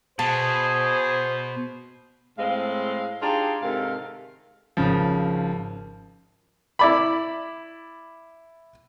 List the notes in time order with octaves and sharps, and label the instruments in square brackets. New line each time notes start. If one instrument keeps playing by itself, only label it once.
[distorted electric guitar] B2 [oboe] G#4 [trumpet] C5 [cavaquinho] A5
[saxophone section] A2 G#3 C4 F5
D4 D#4 F4 G4 G#4
G#2 C3 D#3 A4 A#4 F5
[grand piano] G#1 C#3 F3
[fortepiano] E4 D5 B5